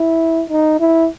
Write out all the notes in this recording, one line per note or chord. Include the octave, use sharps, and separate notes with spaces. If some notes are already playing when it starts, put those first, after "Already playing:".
Already playing: E4
D#4
E4